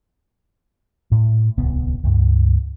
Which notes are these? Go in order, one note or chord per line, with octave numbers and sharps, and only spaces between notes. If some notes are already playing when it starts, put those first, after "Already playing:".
A2
D1 C2 B3
C#2 G2